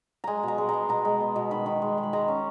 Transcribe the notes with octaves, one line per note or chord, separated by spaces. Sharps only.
G#3 G#5 A#5
B2 A#5
G#3
B3 A#5
B2 A#5
G#3
B3
B2
D#3 B5
D#3
G#3
G#3
B5
G#3 A#5
C#4